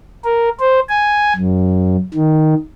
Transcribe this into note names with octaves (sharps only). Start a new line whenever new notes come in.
A#4
C5
G#5
F#2
D#3